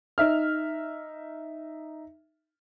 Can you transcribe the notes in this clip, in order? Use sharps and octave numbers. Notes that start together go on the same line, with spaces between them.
D#4 E5 F6